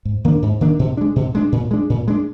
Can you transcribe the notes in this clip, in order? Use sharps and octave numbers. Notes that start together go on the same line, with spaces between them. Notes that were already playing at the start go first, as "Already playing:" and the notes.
G#2
D#3 A#3 D4
G#2
D#3 A#3 D4
B2
G#3 D4
B2
G#3 D4
A#2
G#3 D4
A#2
G#3 D4